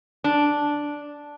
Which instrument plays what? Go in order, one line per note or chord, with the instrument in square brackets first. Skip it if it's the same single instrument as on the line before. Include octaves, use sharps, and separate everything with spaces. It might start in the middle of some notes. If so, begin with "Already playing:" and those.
[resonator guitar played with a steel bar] D4